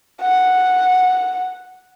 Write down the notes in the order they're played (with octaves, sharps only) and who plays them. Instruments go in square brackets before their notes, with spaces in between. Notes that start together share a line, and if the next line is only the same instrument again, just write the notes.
[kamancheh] F#5